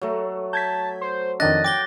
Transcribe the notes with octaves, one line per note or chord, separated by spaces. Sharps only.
F#3 A3
A5 G6 G#6 B6
C5
F2 D#3 D4 D#5 F#6 A6 A#6
G5 D6 A#6 G7